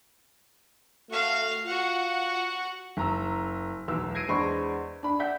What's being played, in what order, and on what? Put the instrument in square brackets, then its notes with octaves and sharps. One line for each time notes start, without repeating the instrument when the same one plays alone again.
[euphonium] A3 [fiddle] F#4 F5
[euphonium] F4 [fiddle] F#4 F#5
[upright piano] F#1 A#5 E6
E1 B1 E3 E6
G#6 A#6 C7 D7 D#7
E2 G#3 D4 C5 B5 C#6
D4 B5
D5 E5 F#5 G6 B6